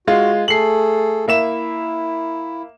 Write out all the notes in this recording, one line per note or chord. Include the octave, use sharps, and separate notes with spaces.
G#3 F4 F#4
A3 G#4 A4 C7 F#7
A#3 E4 E5 E7